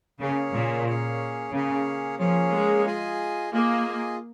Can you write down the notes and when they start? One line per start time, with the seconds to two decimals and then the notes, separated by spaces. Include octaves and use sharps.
0.20 C#3 A#3 C#4 G#4 C#5
0.53 A#2
0.86 A#3 C#4 G#4 C#5
1.52 C#3 A#3 C#4 G#4 C#5
2.19 F3 A#3 C#4 G#4 C#5
2.52 G#3
2.86 F4 G#4 D#5 G#5
3.52 A#3 F4 G#4 D#5 G#5